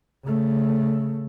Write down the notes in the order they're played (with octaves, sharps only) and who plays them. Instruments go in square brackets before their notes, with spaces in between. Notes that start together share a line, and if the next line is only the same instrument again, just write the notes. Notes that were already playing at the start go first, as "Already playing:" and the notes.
[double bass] C#3 A3